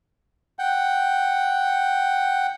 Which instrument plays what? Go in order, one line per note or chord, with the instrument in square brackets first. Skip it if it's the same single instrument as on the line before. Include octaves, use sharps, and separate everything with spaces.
[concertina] F#5 G5